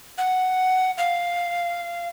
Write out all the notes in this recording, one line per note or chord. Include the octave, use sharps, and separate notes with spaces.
F#5
F5